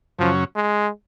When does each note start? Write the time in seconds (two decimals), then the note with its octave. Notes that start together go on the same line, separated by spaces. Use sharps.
0.19 F#2 C#3 F3 F#3 C#4
0.56 G#3